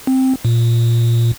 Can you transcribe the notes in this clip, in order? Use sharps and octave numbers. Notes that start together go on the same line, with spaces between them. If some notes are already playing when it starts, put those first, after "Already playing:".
C4
A#2